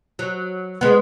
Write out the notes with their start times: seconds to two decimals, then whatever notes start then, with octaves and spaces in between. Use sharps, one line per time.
0.19 F#3
0.81 G#3 B3